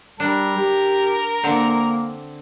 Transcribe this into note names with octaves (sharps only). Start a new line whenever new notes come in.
G3 D4 A#4
G4
D3 A#3 C4